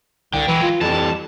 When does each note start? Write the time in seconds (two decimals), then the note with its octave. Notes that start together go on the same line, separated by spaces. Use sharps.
0.34 C2 D3 G5
0.48 E3 F#3 G#3
0.62 F4
0.81 F2 E3 G3 A5